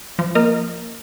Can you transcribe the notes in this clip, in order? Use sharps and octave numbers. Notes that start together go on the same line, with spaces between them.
F3
A#3 A#4 D#5